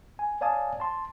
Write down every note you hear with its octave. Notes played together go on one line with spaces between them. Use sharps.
G#5
C#5 D5 F5 G#5 A5 D#6
A5 C6